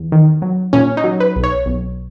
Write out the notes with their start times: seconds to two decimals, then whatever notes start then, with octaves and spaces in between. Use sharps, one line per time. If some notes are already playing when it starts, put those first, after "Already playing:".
Already playing: E2
0.12 D#3
0.42 F#3
0.73 A#2 C#4
0.97 D#4
1.04 F#3
1.20 B4
1.36 B1
1.44 C#5
1.66 B1